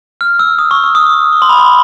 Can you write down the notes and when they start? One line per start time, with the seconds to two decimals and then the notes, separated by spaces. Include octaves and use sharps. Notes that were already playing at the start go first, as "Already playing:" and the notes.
0.21 F6
0.39 E6
0.59 D#6
0.71 C#6
0.84 C#6
0.95 D#6
1.32 C#6
1.42 C6
1.49 B5
1.59 C6